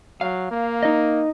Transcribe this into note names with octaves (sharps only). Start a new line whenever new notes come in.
F#3 F5
A#3
D#4 D#5